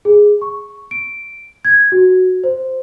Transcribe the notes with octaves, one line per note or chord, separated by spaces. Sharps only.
G#4
C#6
D7
G#6
F#4
C5